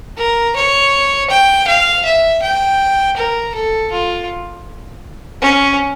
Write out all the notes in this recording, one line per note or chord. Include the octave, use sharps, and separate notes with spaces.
A#4
C#5
G5
F5
E5
G5
A#4
A4
F4
C#4